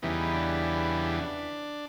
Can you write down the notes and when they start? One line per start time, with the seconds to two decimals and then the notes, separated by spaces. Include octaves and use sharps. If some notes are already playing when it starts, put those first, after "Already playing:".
0.02 E2 C#3 E3 G3 B3 D#4
0.32 D4